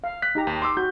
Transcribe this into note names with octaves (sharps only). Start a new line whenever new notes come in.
F5
F#6 B6
D#4 G4 A#5
D#2
C6 D6 E6
F#4 G6